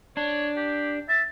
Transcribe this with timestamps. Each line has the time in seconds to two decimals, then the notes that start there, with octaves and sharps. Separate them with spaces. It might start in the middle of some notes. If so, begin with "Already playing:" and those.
0.17 D4 C#5
0.57 G4
1.09 E5 A6